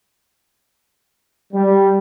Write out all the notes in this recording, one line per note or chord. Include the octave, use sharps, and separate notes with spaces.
G3